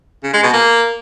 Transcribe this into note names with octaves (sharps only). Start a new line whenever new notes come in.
C#3
G#3
B2
A#3